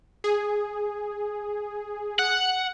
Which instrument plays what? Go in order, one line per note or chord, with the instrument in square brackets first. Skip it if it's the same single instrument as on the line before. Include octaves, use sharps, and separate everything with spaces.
[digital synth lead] G#4
[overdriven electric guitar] F#5